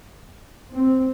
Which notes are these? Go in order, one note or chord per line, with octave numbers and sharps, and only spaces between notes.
C4